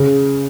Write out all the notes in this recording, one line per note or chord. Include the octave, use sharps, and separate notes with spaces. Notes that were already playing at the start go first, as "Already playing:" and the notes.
Already playing: C#3